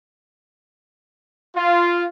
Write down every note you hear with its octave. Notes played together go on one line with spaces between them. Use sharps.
F4